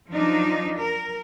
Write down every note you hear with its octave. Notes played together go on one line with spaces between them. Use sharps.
F3 F#3 D4 D#4
A#4